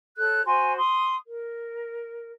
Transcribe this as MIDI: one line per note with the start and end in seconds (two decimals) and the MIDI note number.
0.18 0.42 69
0.18 0.42 73
0.18 0.42 90
0.46 0.76 66
0.46 0.76 72
0.46 0.76 80
0.46 0.76 84
0.77 1.15 84
0.77 1.15 87
1.26 2.31 70